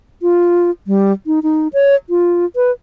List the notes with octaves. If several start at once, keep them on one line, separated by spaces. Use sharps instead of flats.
F4
G3
D#4
D#4
C#5
F4
B4